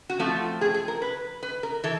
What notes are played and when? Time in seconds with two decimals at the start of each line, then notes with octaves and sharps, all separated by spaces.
0.10 F#4
0.19 F3 A3 C4 F4
0.61 G#4
0.74 G#4
0.88 A#4
1.02 B4
1.43 B4
1.63 A#4
1.84 E3 A4